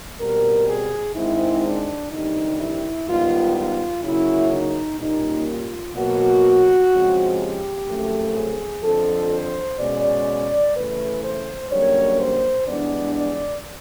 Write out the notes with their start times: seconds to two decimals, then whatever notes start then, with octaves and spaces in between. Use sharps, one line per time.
0.20 B2 G3 C4 A#4
0.68 G#4
1.16 G#2 D#3 G#3 C4 E4
1.64 D4
2.12 D2 C3 D#3 G3 D#4
2.60 E4
3.08 G#2 D#3 G3 B3 F4
3.56 F4
4.04 C#3 F#3 A#3 C#4 E4
4.51 D#4
5.00 A#2 G3 A#3 C#4 D#4
5.48 F4
5.95 B2 F#3 A#3 F#4
6.91 C#3 F3 G#3 C4
7.40 G4
7.87 F#2 C#3 F3 A3 C4
8.36 G#4
8.83 F2 D3 F3 A4
9.32 C5
9.80 B2 G#3 C#4 D5
10.76 C#3 E3 A3 B4
11.23 C5
11.71 F#2 D3 G3 A#3 C#5
12.19 C5
12.67 G2 E3 G#3 B3 D4 D5
13.15 D5